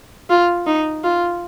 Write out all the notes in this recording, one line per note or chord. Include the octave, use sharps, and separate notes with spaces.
F4
D#4
F4